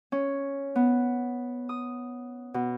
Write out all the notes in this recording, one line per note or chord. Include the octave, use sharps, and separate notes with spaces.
C#4
B3
D#6
B2